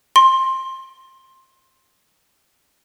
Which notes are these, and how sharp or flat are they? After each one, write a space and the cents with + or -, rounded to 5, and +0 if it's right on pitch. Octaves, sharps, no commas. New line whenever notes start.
C6 +15